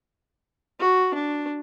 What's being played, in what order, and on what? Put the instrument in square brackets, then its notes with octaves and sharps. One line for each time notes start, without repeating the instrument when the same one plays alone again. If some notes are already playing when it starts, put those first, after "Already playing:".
[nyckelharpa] F#4
D4